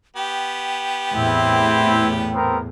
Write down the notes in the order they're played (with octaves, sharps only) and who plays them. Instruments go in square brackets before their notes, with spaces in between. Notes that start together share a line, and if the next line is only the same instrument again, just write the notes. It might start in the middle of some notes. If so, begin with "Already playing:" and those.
[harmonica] B3 G4 [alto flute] G5
[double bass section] E2 A2 [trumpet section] C4 E4
[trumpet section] B3 C4 A#4